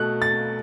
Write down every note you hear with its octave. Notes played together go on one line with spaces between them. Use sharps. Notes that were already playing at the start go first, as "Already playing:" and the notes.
Already playing: B2 A3 F#6
A6